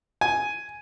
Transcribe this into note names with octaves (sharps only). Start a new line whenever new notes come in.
G#5